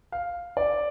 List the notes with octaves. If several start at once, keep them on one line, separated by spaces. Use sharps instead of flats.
F5
D5